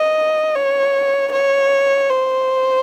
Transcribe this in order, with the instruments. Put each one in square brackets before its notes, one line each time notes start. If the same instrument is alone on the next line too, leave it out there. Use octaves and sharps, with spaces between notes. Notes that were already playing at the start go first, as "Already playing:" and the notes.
Already playing: [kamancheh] D#5
C#5
C#5
C5